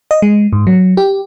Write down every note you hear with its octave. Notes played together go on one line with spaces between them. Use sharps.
D#5
G#3
G#2
F#3
G4